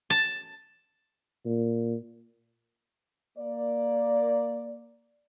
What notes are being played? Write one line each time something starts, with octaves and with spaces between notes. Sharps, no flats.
A5
A#2
A#3 D5